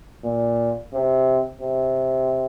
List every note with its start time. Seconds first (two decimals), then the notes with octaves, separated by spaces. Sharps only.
0.24 A#2
0.93 C3
1.61 C3